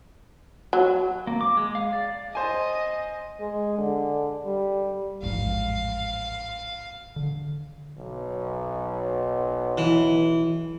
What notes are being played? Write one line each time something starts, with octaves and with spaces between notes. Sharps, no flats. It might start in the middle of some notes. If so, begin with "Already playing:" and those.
F#3
A#3
D6
G#3
F5
D5
C5 D#5 G#5
G#3
D3
G3
A1 F2 G#2 F5
D3
B1
E3